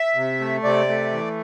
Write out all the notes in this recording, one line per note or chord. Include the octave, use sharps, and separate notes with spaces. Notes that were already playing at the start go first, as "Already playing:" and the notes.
Already playing: E5
C3
A3
C3 D5
A3
E3